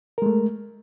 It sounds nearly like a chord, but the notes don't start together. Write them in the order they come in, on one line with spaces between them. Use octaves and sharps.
A#4 G#3 A3